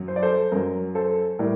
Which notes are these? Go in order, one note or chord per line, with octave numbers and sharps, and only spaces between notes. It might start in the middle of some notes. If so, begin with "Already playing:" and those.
Already playing: F#2 F#3
C5
D5
A4 C5
F#2 F#3 A#4
A4 C5
A2 G3 A#4 D5